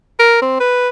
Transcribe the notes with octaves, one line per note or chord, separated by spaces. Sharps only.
A#4
C4
B4